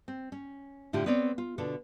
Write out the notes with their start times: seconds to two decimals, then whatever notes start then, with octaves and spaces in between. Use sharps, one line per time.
0.08 C4
0.32 C#4
0.93 A2 D3 E4 F4 G4
1.06 B3 C4 C#5 D5
1.38 F4
1.58 B2 D3 D4 F4 A4